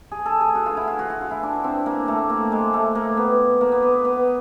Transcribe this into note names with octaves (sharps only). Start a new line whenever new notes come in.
G#4
A4
G#4
F#4
F4
E4
F4
F#4
F#4
F4
E4
D4
C4
A#3
A3
A#3
G#3
A3
A#3
B3
A#3
B3
B3
B3